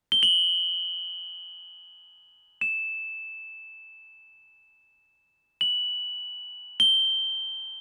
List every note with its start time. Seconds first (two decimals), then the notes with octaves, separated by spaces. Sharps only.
0.12 G7
0.23 F#7
2.61 E7
5.61 F#7
6.80 G7